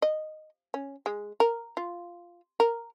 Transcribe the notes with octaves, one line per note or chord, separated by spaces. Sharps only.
D#5
C#4
G#3
A#4
F4
A#4